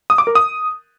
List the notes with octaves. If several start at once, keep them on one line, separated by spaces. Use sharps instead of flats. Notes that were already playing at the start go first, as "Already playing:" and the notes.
D#6
D6
A#4
D#6